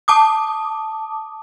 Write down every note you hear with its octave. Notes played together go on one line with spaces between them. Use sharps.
A5 D6 D#6